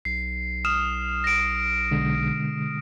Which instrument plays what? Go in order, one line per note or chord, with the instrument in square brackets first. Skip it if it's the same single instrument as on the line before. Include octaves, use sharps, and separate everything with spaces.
[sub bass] B1 [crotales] C7
[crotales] D#6 F6 E7
A#6 D7
[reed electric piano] B2 D3 G#3